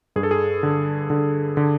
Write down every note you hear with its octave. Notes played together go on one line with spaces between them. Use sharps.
G2 G#4
A4
G#4
D3
D3
D3